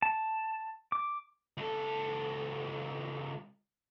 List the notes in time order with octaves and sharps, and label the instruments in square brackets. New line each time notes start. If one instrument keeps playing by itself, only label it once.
[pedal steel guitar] A5
D6
[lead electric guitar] C#2 A4